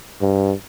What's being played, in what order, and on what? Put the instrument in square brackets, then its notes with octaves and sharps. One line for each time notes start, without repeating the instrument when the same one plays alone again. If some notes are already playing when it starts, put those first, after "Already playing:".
[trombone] G2